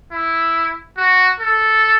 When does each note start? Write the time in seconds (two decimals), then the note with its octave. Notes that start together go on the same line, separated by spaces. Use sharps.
0.12 E4
0.97 F#4
1.40 A4